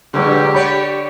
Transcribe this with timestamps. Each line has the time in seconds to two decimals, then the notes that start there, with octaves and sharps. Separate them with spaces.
0.14 G2 A#2 D3 F#3 G#3 G4
0.54 D3 C#5 D5 B5